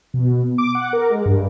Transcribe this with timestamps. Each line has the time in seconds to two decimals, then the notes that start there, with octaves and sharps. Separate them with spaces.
0.14 B2
0.58 D6
0.75 F#5
0.93 A#4
1.10 G#3
1.26 G2